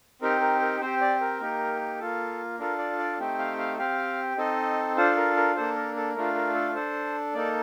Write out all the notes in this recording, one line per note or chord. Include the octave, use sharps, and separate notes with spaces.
C4 D#4 G4 A#4
A#4
A#4
C4 G4 C5
D5
A#4
A#3 D#4 G4
A#3 F4 A4
D4 F4 A4 A#4
D5
D5
A3 C4 D#4 G4
F5
F5
C4 G4 F5
C4 D#4 A4 D#5
D4 F4 A4 C5
A#4
A#4
A#3 D4 A4 C5
A#4
A4
A3 D4 F4 A#4
A#4
A4
D4 A4 C5
A#3 D#4 A4 D5